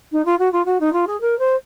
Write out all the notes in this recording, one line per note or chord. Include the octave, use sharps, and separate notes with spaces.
D#4
F4
F#4
F4
F#4
D#4
F4
G#4
A#4
C5